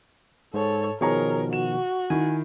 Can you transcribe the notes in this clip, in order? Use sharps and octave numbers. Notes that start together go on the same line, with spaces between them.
G#2 A4 C#5
B2 D#3 F3 G#4 A#4 C#5 A#5
F#4 E7
D#3 E4 G#5